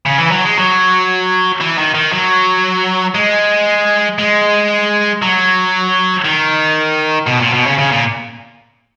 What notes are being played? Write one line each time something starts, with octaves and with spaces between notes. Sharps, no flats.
C#3
E3
F#3
G#3
F#3
E3
D#3
D#3
F#3
G#3
G#3
F#3
D#3
B2
A#2
B2
C#3
C#3
A#2